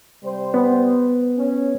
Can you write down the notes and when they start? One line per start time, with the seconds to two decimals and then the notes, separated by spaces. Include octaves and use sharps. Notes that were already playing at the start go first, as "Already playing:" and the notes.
0.24 C3 G3 C5
0.54 B3
1.38 C#4